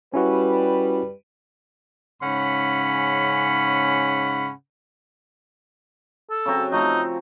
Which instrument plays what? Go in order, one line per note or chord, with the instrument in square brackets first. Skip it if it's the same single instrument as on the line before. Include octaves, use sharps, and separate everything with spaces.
[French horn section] G3 B4 [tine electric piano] C#4 E4 F#4
[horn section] G#2 C#3 C#4 F#5 B5
[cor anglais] A4
[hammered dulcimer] C#3 F#3 C4
[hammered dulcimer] F3 A3 A#5 [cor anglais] D#4